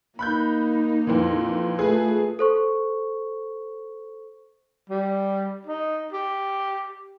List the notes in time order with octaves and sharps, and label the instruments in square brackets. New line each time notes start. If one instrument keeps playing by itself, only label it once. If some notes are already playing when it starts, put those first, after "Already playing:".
[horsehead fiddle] A#3 D#4 [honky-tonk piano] B5 F#6 G6
[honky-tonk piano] F2 A#2 E3
[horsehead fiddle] A3 F4 [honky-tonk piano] G#4 B4
[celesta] A4 C5 C#6
[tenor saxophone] G3
D#4
G4